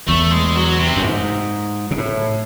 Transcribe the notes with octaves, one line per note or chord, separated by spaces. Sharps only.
E2 A3
G#3
F#3
C3
F#2
G#2
C3
A2